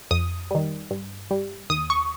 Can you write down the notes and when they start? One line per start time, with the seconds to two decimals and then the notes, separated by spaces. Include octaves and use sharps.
0.11 F2 D#6
0.51 D#3 G3
0.91 G2
1.31 G3
1.70 D#2 D#6
1.90 C#6